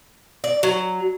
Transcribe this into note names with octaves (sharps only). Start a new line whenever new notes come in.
D5
F#3